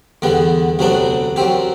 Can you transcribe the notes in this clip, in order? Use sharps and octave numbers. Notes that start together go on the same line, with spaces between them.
E2 D3 G3 B3
D2 C3 F#3 B3 D4
F#2 F#3 C4 G4